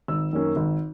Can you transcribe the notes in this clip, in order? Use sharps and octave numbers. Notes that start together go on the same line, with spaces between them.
G#1 E6
F#2 D#3 A#3 C#4
G#1